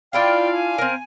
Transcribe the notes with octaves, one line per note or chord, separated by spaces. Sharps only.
D4 E4 F4 D5 F5 G5
G#5
C4 A#4